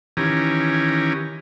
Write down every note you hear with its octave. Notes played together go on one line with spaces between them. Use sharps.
D#3 E3 C#4 G4 G#5 A#5